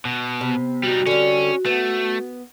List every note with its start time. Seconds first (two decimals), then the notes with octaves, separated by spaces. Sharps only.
0.05 B2
0.41 C3 B3
0.83 G3 D#4 F#4
1.07 D3 G3 C#4
1.66 A3 B3